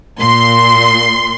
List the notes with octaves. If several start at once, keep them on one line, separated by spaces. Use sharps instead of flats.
A#2 C6